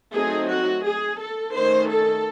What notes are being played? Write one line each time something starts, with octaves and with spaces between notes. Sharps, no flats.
F#3 A3 C4 D#4 G#4
F#4
G#4
A4
D#3 A3 C#4 C5
A4